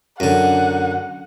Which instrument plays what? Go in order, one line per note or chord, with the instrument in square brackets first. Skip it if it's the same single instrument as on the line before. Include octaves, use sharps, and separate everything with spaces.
[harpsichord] F#2 D3 [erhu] F#5